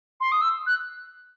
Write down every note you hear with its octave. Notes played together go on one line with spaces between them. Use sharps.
C6
D#6
E6
F#6